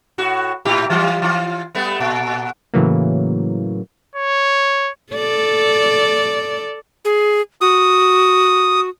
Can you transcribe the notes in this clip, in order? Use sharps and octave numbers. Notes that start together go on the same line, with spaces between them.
A2 F#4
A2 E4 G4
E3 G3 F4
E3 F4
G3 A3 B3
A#2
A2 C#3 E3 F#3 A#3
C#5
A4 D5
G#4
F#4 D#6